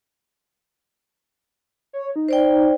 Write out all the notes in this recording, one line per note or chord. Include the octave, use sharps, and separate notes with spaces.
C#5
D#4
C5 D5 G5